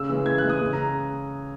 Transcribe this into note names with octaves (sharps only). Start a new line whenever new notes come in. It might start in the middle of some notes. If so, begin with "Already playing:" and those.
Already playing: C#3 E6
E3 G#3
C#3 G#6
F#6
E3 G#3
D#6
C#3
A#5